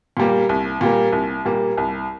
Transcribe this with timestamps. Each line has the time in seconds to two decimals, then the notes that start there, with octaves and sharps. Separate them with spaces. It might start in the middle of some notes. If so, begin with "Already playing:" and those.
0.17 A#2 G3 A#3
0.49 C2
0.81 A#2 G3 A#3
1.12 C2
1.45 A#2 G3 A#3
1.77 C2